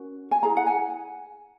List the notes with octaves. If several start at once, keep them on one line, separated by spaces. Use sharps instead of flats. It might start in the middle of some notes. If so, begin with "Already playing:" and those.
Already playing: C#4 F#4 A#4
G#5
E4 G#4 B4 A#5
F#5
G#5